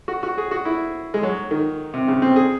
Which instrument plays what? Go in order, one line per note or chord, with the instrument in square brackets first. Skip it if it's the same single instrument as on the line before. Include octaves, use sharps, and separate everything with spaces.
[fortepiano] F#4
F#4
G#4
F#4
E4
G#3
F#3
D#3
C3
C#3
C4
G#4